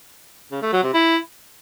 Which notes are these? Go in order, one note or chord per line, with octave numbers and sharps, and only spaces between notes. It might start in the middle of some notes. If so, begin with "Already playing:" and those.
C#3
A3
F#3
C3
E4